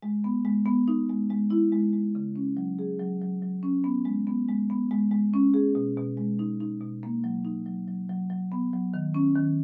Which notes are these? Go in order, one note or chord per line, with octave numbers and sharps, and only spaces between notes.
G#3
B3
G#3
B3
D#4
G#3
G#3
E4
G#3
G#3
C#3
C#4
F#3
G#4
F#3
F#3
F#3
C#4
B3
G#3
B3
G#3
B3
G#3
G#3
C#4
G#4
B2
B2
G#3
D#4
D#4
B2
A#3
F#3
D#4
F#3
F#3
F#3
F#3
B3
F#3
D#3
C#4
D#3